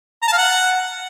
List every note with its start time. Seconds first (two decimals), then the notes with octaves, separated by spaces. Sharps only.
0.22 A#5
0.28 A5
0.33 F5
0.38 F#5